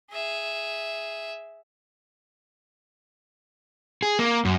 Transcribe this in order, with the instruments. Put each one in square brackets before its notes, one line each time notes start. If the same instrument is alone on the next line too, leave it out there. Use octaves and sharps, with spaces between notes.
[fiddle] G#4 E5
[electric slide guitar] G#4
A#3
F#2